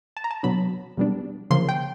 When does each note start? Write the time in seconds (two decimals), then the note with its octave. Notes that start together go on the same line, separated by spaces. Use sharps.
0.17 A5
0.24 A#5
0.31 A5
0.43 B2 F#3 B3 D4 B5
0.97 B2 G3 B3 D4
1.51 C#3 F3 A#3 C#4 C6
1.69 G5